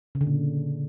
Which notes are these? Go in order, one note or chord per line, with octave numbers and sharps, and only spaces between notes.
C#3
D3
A#2